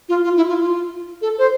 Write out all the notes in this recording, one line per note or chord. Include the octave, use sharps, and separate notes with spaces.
F4
F4
E4
F4
F4
A4
C5